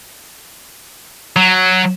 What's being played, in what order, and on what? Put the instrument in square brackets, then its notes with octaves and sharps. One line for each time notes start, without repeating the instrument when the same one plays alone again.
[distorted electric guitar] F#3